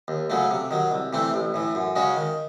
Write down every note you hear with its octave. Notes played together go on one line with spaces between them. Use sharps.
D#2
C#3 F#3 A3
C3
D#3 F#3
C2
C3 E3 A3 C4
A1
A2 E3
F#2
C#3 G#3 C#4 F#4
D#3